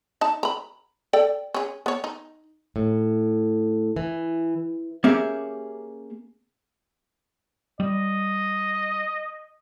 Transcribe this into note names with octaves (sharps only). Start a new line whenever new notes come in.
D#4 A5
A#5 B5
A4 D5 G5
C#4 G#4
B3 C#5
D#4
A2
E3
A#3 C#4 G4 G#4 E5
G3 D#5